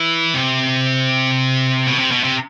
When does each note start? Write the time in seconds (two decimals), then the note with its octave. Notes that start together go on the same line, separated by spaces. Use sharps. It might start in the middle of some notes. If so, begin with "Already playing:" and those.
Already playing: E3
0.34 C3
1.87 B2
1.99 C3
2.11 B2
2.24 C3